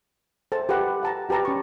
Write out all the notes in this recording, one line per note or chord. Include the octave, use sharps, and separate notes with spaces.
A4 C5 A5
G4 A4 B4 F#5
F#5 A5 A#5
F#4 G4 B4 A5 A#5
C#4 C#6